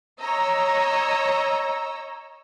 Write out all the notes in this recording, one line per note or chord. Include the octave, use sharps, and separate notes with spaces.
C#5 D#5 A#5 E6